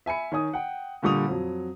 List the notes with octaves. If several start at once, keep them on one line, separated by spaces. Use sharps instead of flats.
E5 G#5 B5 C#7
D#3 C#5 G#5 D#6
F#5 G5
A#2 D3 G3 C#6 D#6 F7
F2 F#3